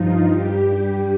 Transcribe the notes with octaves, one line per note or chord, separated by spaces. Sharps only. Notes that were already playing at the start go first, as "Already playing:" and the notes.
Already playing: G2 F3 D#4 F4
G2 G3 G4